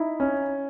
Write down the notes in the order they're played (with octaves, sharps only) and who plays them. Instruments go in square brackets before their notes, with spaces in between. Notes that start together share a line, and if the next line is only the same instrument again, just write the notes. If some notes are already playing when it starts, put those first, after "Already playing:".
Already playing: [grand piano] D#4 E4
C#4